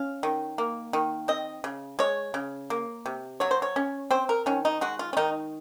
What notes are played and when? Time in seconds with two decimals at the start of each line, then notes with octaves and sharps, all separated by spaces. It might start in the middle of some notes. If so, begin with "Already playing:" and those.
Already playing: C#4 F5
0.23 D#3
0.58 A#3
0.93 D#3
1.28 C4 D#5
1.64 C#3
1.99 G#3 C#5
2.34 C#3
2.70 A#3
3.06 C3
3.40 F#3 C#5
3.51 C5
3.62 C#5
3.76 C#4
4.11 C4 C5
4.29 A#4
4.46 D#3 C#4
4.65 D#4
4.81 G#3 F#4
4.99 F4
5.13 C#4
5.17 D#3 D#4